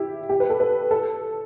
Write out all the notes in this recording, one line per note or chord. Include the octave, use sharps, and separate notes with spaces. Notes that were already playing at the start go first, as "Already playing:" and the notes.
Already playing: E4 G4
G4
B4
A4
B4
A4